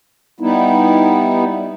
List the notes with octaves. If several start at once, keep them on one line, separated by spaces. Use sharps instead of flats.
G3 B3 D#4 E4